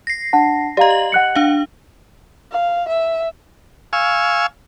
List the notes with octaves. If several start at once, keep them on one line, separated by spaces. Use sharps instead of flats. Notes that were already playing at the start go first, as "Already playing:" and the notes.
A#6 C7
D4 F#5 A5
G4 D5 D#5 F5 A#5
F#7
F#5 F#6 C#7
D4 F5
F5
E5
F5 G#5 C#6 E6